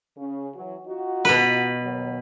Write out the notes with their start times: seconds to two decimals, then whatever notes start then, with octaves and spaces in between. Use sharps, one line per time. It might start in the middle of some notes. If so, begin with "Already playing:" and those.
0.17 C#3
0.55 E3 F#3
0.87 D#4 F4 F#4
1.25 B2 B4
1.82 D#2 F#3